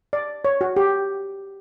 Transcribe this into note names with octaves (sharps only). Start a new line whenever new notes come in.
D5
C#5
F#4
G4